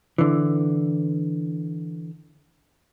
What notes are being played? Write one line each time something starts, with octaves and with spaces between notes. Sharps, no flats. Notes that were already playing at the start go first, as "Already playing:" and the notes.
D3 E3